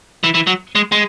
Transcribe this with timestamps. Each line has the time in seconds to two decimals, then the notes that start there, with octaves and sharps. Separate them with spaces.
0.24 E3
0.34 E3
0.47 F#3
0.75 G#3
0.92 G#3